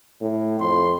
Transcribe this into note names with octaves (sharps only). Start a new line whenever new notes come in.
A2
F2 C6